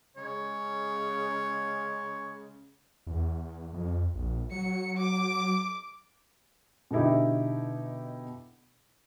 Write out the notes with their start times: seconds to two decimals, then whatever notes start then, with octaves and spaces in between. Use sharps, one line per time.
0.17 C#3 G#3 C#5
3.07 E2
3.73 F2
4.14 A#1
4.51 F#3 C#7
4.97 D6
6.91 B2 D3 D#4 E4 G4